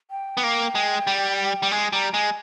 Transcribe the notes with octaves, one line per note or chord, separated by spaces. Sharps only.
G5
B3
A#3
G#3
G3
G3
G#3 G#5
G3 A#5
G#3 G#5